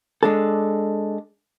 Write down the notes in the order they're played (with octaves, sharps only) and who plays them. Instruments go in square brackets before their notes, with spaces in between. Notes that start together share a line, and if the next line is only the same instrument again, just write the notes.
[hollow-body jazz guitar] G#3 D4 A4